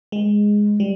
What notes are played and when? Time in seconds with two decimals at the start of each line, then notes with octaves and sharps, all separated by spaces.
0.12 G#3
0.80 G3